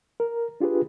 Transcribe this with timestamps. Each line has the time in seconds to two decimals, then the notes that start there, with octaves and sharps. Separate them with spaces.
0.20 A#4
0.60 D4 F4 G4 G#4 B4